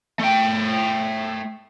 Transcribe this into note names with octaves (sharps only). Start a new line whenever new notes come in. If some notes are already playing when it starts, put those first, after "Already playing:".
A3 G5